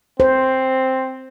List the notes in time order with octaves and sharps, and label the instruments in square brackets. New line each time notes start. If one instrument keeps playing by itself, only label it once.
[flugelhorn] C4 [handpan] C5